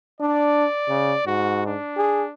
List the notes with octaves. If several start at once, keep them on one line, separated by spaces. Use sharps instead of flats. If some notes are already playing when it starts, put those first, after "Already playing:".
D4 D5
C#3
G#2 F#4
D4
G#4